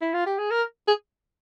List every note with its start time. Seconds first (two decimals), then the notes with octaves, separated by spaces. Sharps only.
0.01 E4
0.13 F4
0.26 G4
0.38 G#4
0.50 A#4
0.88 G#4